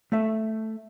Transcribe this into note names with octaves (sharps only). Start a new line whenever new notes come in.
A3 E5